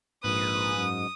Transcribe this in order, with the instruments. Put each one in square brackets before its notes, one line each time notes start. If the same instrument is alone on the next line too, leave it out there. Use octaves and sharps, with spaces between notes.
[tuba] A#1 [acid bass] G#2 [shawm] B4 [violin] D#6
[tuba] F#2